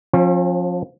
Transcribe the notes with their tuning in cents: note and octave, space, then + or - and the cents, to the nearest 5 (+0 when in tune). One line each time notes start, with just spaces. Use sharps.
F3 +20 C#4 -40